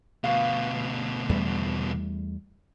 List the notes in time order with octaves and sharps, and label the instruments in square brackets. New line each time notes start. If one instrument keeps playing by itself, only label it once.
[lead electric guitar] D2 B2 [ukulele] F5
[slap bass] E2 G3 A3